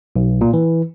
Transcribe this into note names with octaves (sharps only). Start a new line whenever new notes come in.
B1
A#2
E3